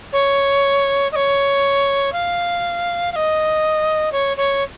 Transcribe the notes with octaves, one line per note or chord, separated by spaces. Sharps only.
C#5
D#5
C#5
F5
F5
D#5
C#5
C#5